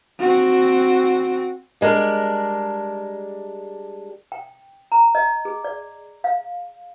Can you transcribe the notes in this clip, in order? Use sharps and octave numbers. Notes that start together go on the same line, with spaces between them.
C4 F#4
G3 G#3 D4 A#4
G5
A#5
D#5
G#4
D5
F5